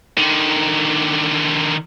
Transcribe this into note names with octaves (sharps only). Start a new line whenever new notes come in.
D3 D#3